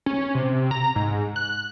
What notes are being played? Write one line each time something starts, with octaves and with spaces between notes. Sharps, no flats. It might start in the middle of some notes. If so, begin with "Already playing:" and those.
C#4
C3
A#5
G#2
F#6